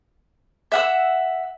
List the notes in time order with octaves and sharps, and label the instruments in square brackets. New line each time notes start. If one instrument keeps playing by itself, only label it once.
[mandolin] E5 F#5 E6